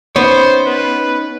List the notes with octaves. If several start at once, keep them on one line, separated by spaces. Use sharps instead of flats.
B3 C#4 D#4 C5 C#5
B4